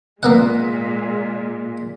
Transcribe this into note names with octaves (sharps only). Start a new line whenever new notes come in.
A#2 G#3 A#3 B3 F#5